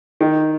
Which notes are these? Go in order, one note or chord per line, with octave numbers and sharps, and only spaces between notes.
D#3